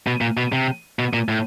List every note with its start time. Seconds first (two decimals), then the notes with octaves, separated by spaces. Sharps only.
0.07 B2
0.21 A#2
0.37 B2
0.52 C3
0.99 B2
1.13 A#2
1.29 A2